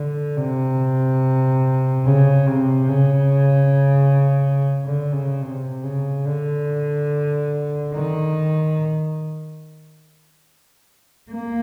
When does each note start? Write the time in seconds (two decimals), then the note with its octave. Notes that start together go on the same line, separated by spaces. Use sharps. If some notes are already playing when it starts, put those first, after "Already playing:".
Already playing: D3
0.36 C3
2.05 C#3
2.47 C3
2.89 C#3
4.85 D3
5.13 C#3
5.41 C3
5.83 C#3
6.25 D3
7.94 D#3
11.31 A#3